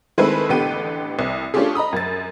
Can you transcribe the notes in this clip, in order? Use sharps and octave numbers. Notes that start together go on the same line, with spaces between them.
D#3 G#3 A3 C4 E4 B4
A1 D3 B3 G4 G5 D#7
C2
A3 C#4 D4 F4 G4 G#4
D#5 A#5 B5 D#6
F#2 A6